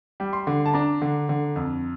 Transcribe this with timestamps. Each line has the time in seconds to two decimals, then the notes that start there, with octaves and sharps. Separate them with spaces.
0.20 G3
0.33 C6
0.47 D3
0.65 A5
0.73 D4 A#5
1.02 D3
1.29 D3
1.56 F2